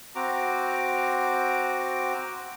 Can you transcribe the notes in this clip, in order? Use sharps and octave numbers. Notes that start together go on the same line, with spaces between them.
C4 F#4 A#5 D6